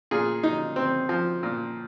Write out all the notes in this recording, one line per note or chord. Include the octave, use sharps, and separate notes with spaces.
A#2 G#4
D#4
C4
F3
A#2